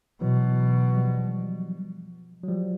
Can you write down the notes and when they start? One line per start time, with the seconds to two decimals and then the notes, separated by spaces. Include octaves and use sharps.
0.21 B2 E3 F#3
0.97 F3 G3
2.43 F#3
2.48 F3 G3